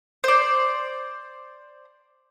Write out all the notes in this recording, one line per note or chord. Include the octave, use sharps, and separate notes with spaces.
C5 D5